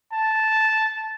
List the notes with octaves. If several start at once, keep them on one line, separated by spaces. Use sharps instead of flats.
A5